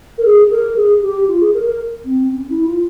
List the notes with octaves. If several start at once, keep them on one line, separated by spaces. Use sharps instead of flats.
A#4
G#4
A#4
G#4
G4
F4
G#4
A#4
A#4
C4
C#4
E4
F4